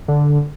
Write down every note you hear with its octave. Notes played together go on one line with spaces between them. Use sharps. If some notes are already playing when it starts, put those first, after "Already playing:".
D3